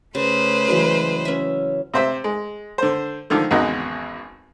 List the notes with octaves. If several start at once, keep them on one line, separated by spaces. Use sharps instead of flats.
C#3 A3 B4 C5
E3 F#3 G#3
C#4 E5
C3 C5 E5
G#3
D3 C5
D3 D#3 F3 D4
G#1 E2 C#3 G#3 D#4 F#4